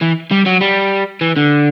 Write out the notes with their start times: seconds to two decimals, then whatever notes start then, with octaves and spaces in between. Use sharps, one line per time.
0.02 E3
0.31 G3
0.46 F#3
0.61 G3
1.21 E3
1.36 D3